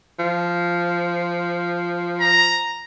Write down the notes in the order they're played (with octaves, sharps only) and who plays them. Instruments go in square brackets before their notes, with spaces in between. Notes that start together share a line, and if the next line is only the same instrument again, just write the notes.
[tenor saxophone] F3
[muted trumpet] A#5